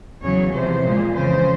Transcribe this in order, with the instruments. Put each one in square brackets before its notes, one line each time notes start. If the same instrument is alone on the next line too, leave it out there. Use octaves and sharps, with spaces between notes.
[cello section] E2 C#3 F#3 C#5
E2 C3 F3 C5
A#2 F3 G#3
F2 C#3 E3 C5